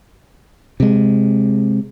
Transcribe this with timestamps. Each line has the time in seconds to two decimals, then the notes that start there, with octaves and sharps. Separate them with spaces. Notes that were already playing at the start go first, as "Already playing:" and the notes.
0.80 C3 G#3